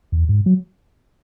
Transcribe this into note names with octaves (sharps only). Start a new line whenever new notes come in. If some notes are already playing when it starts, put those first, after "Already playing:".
E2
G#2
F#3